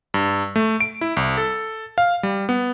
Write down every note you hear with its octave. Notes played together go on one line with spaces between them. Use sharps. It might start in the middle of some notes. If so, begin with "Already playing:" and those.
G2
A3
D7
E4
C2
A4
F5
G3
B3